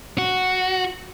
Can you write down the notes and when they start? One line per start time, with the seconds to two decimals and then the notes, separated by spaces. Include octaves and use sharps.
0.18 F#4